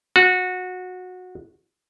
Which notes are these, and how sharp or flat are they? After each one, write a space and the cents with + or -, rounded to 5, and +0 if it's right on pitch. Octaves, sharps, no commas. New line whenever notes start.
F#4 -20